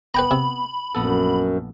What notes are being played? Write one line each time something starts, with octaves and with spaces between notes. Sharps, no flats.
B3 B4 G5 A#5 B5
C3
A#1 F#2 B3 A4